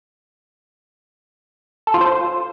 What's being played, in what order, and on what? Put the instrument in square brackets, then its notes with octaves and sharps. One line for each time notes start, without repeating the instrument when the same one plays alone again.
[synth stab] A4
F4
C5